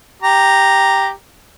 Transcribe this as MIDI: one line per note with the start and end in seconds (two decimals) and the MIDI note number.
0.22 1.11 67
0.22 1.11 82